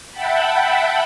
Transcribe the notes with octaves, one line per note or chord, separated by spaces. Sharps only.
E5 F#5 G5 A5 B5